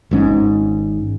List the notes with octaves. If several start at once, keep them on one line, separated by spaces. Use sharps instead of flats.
G#1 G#2 C#4